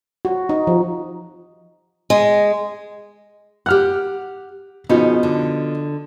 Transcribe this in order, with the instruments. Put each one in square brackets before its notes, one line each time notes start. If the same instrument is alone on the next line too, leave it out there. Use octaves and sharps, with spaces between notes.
[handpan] F#4
D#4
F3
[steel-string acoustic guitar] G#3
[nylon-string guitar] G4 F#5 [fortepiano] F6 F#6
[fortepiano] B2 F3 [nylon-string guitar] C#4 D#4 G#4
[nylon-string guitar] D3